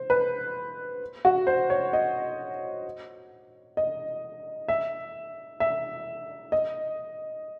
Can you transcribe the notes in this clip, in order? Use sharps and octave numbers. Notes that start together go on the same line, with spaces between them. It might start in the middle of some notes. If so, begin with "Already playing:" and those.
Already playing: C5
B4
F#4
C5
C#5
D#5
D#5
E5
E5
D#5